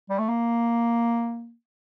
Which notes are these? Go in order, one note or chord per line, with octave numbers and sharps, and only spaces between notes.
G3
A3
A#3